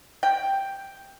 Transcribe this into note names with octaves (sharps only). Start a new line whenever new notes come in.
G5